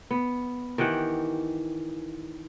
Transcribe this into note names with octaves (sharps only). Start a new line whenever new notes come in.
B3
D#3 E3 G4 F#5